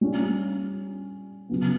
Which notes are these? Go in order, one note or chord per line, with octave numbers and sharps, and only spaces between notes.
G3 C#4 G4
C#3 F#3 B3